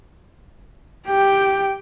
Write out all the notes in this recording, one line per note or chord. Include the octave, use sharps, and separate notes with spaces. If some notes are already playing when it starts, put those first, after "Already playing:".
G4 G5